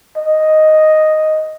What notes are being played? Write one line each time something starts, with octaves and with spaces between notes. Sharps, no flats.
D#5